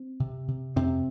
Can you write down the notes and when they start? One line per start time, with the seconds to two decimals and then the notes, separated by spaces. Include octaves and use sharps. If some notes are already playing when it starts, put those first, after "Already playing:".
Already playing: C4
0.20 C3
0.48 C3
0.76 F2 C3 C4